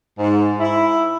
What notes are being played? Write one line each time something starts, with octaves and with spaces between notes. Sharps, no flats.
G#2
E4